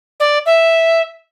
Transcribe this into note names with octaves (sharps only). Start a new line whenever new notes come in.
D5
E5